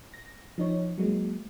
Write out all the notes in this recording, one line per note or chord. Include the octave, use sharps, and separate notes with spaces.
A#6
F3 D#4 C#5
F#3 G#3 A#3